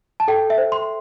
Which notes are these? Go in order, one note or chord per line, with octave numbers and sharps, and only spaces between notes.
A5
A4 G5
E5
C5
C6